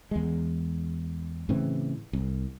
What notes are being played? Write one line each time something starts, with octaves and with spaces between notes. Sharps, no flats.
E2 G#3
A2 C#3 E3 C4
C2